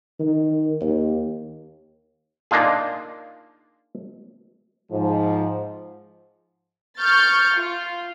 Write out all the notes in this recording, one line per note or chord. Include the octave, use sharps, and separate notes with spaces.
D#3
D#2
A#3 D4 D#4 F4 G#4
G#2 F3
C#6 F6 G6 A6
F4